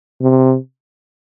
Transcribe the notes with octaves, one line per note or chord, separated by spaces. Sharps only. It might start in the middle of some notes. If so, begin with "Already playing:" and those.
C3